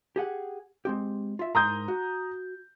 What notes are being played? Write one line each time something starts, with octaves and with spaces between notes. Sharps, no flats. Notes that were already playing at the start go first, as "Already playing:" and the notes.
G4 G#4 F#5
G#3 C4 G4
F4 E5
G#2 A#4 A#5 C6 D#6 G6
F#4